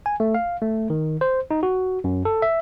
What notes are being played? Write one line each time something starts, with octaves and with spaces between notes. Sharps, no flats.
G#5
A3
F5
A3
D#3
C5
D#4
F#4
F#2
A4
E5